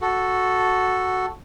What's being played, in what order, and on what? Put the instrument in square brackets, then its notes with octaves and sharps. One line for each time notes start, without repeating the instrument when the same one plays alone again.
[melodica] F#4 A4